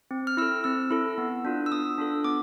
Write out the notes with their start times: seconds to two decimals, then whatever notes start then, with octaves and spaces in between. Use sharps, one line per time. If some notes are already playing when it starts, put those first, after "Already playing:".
0.11 C4
0.27 F6
0.37 E4 A4 E6
0.64 C4 E6
0.91 E4 A4
1.18 B3
1.45 D4 F4 A4
1.66 E6
1.72 B3 D#6
1.98 D4 F4 A4
2.24 B3 D6